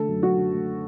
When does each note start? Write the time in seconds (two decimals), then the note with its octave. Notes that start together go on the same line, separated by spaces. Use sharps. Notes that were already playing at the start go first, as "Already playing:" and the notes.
Already playing: D3 A3 A4
0.09 F#2
0.22 F#2 F#4
0.37 D3
0.53 A3